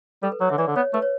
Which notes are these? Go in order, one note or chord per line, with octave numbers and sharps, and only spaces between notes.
G3 A4
B4
F#3 C#5
D3 E5
E3 D5
D3
B3 C#5
A3 B4
C#5